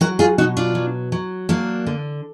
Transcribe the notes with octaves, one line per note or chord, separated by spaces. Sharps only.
F#3 F#4 A#4
F4 G#4
B2 D#4 F#4
D4 F4
F#3
F#3
F#3 A#3 D4
D3